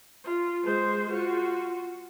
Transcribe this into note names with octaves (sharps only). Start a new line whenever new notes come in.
F4
G#3 C5
F4 F#4